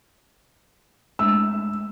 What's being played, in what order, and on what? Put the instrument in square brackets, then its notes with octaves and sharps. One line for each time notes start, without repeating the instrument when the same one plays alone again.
[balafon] G#3 A3 D4 [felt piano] E6